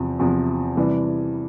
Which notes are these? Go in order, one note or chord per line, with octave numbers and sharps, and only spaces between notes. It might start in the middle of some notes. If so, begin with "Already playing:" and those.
Already playing: E2 C3 F3
E2 C3 F3
C3 E3 G3